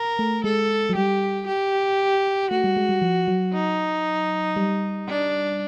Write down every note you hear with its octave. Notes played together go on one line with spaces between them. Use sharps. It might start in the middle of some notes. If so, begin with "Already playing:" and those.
Already playing: A#4
A3
G#3 A4
F#3
G3 G4
G4
A3 F#4
G3
G#3
G3
F3
F#3
D#4
G3
D4